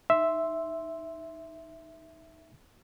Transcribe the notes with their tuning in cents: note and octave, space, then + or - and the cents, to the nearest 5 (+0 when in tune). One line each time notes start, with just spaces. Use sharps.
D#4 +0 E5 +0 C6 +0